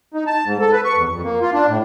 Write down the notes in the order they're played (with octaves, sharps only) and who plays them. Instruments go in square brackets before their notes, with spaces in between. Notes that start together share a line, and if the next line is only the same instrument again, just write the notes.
[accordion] D#4
A5
G#2
A4
B4
C#6
E2
F2
A#3
F4
D4
A2